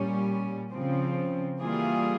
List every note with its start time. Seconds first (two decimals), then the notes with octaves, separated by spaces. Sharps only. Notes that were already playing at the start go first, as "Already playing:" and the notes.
Already playing: A#2 G3 C#4
0.71 C#3 F3 C4
1.59 E3 G3 A#3 F4 G#4